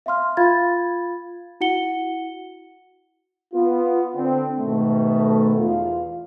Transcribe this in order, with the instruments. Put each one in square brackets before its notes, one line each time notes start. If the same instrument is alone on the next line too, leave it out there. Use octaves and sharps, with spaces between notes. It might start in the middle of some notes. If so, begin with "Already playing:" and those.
[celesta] E5 F5 C6 F6
F4 F5 B5 G#6 A6
E4 F#4 F#5 C#7 G7
[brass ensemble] B3 F4
D3 C4 D4
G#2 B2 D#3 A3
E2 F4 F5